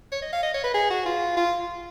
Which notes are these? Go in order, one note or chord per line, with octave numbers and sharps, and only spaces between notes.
C#5
D#5
F5
D#5
C#5
B4
G#4
F#4
F4
F4